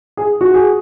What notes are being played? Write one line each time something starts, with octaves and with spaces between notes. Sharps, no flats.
G#4
F#4
G#4